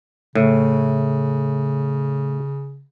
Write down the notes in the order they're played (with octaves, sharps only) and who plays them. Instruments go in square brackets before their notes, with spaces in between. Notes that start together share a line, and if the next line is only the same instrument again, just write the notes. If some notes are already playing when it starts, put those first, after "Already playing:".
[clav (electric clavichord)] A2 [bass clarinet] C#3